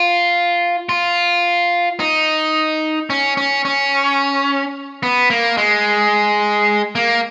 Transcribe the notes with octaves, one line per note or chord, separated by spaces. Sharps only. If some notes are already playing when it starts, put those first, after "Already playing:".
Already playing: F4
F4
D#4
C#4
C#4
C#4
B3
A#3
G#3
A#3